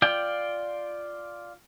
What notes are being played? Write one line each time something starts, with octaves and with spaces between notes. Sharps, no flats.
F4 D5 G5